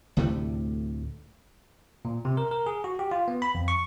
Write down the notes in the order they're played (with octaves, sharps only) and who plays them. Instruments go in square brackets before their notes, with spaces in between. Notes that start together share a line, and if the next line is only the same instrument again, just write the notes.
[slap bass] D2 A2 C3 A3
[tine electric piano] A#2
C3
A#4
A#4
G#4
F#4
G4
F4
B3
B5
F2
C#6